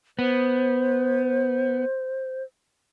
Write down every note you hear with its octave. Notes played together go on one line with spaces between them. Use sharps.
B3 C5